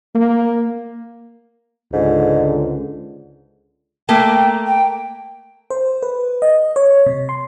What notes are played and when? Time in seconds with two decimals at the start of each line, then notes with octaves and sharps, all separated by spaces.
0.15 A#3
1.93 C#2 G#2 D3
4.09 A3 A#3 G5
4.67 G5
5.70 C5
6.03 B4
6.42 D#5
6.76 C#5
7.06 C3
7.29 C6